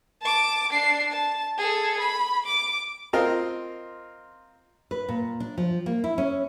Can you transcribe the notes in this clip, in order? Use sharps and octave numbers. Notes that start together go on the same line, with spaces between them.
A5 D6
D4 C7
A5
G#4 A4
B5
D6
C4 F4 A#4 D#5 F5
B4
A#2
D4
F3
A#3
E4
C#4